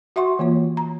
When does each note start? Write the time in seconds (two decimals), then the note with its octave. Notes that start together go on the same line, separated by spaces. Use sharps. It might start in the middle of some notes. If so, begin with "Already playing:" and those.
0.16 F#4 E5 F#5 C6 C#6
0.39 E3 A#3 F4 C#5
0.77 A#5